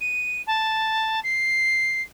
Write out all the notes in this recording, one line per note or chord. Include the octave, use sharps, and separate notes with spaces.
D#7
A5
C7